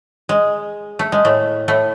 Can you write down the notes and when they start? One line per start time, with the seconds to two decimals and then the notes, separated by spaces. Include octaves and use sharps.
0.29 G#3
0.99 A3
1.12 G#3
1.25 A2 A3
1.68 A2 A3